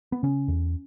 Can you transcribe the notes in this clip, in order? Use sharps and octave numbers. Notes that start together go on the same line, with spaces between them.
B3
C#3 C#4
E2